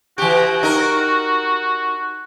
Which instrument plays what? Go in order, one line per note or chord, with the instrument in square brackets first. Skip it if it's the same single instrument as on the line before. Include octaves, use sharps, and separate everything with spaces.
[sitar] E3 G4 [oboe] F#4
[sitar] D#4 A#4